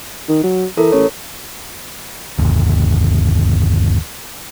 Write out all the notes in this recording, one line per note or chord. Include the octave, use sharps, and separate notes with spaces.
D#3
F#3
E3 A4 A#4
A1 C#5
G1 D#2